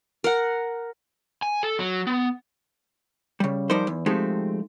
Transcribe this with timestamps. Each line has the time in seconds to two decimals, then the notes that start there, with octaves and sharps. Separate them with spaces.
0.24 A#4 F#5
1.42 G#5
1.63 A4
1.79 F#3
2.07 B3
3.40 C#3 G3
3.70 F3 G3 D#4 A#4 C5
3.87 E2
4.06 F3 G#3 A3 C4 D#4 G4